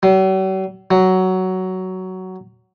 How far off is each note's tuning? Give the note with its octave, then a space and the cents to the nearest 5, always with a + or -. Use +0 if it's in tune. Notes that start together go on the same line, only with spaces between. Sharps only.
F#3 +45
F#3 +10